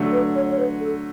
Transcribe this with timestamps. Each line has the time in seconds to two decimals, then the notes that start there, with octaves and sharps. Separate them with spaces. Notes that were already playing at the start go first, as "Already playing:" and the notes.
Already playing: D3 F#3 A3
0.12 B4
0.35 C#5
0.49 C#5
0.58 B4
0.81 A4